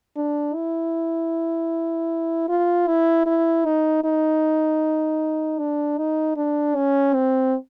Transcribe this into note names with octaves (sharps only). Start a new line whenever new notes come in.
D4
E4
F4
E4
E4
D#4
D#4
D4
D#4
D4
C#4
C4